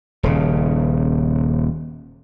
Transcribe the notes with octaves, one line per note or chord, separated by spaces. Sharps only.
D#1 C#3